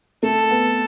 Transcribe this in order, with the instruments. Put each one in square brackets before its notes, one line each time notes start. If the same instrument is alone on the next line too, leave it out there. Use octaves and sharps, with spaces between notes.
[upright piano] A3 [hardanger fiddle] A4
[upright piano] B3